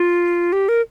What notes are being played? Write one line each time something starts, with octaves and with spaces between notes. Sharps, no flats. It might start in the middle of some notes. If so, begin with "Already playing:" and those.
Already playing: F4
G4
A#4